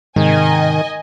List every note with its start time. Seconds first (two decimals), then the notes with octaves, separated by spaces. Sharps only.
0.16 G#2 C3 D#3 D#5 G#5